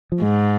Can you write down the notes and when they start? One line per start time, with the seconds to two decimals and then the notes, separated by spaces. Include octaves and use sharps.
0.12 F3
0.22 G#2 G#3